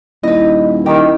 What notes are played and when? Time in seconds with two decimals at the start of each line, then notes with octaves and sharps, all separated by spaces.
0.23 D#1 E4 B4 D#5
0.86 D#3 G4 E5